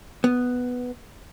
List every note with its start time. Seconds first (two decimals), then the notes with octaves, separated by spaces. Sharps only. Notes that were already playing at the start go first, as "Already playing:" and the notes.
0.24 B3